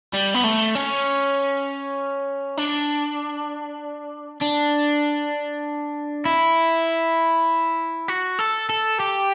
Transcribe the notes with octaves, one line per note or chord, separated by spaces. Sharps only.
G3
B3
A3
C#4
D4
D4
E4
F#4
A4
A4
G4